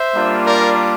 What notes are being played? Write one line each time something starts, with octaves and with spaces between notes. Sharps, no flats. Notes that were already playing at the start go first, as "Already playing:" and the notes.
Already playing: C5 E5
G3 A#3 D4 F4
A#4 D5